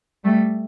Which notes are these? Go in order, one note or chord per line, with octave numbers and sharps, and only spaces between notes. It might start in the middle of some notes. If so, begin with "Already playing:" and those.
G3 A3